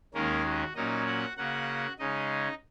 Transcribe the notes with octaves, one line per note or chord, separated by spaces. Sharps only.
D#2 D#3 G#3 A#3 C#4 A#4
F#4
A#2 F#3 A#3 C#4 D#4 D#5
F#4 F#5
C#3 A#3 C#4 F#4 F#5
C#3 G#3 C#4 D#4 D#5